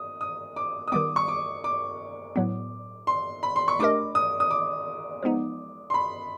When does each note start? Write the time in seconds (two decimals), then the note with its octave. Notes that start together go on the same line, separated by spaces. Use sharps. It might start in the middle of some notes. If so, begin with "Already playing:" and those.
Already playing: D#6
0.21 D#6
0.56 D6
0.88 D#6
0.92 D#3 G3 B3 D6
1.16 C#6
1.28 D6
1.64 D6
2.36 A2 F#3 B3
3.07 C6
3.43 B5
3.56 C6
3.68 C#6
3.79 A3 D4 G4 A#4 D#5 D6
4.15 D#6
4.40 D#6
4.51 D6
5.23 F3 G#3 B3 D#4
5.90 C6
5.94 B5